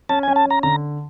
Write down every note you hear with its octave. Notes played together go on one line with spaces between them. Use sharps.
C#4 A5
C#4 G#5
A5
C#4 A#5
D3 A#5